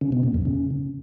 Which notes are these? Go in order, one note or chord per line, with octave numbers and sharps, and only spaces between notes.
C#3
B2
A#2
F2
C#3